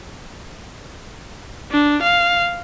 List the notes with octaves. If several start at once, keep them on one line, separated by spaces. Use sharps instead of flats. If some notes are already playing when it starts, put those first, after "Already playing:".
D4
F5